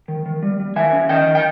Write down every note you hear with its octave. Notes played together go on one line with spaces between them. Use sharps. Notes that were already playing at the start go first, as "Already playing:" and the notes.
D#3
D#3
G3
G3
D#3 E5 G#5
C#4
D#3 D#5 G5
D#3
G5